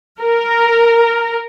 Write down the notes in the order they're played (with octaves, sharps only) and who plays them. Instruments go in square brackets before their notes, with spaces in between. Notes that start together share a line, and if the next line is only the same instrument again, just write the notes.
[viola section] A#4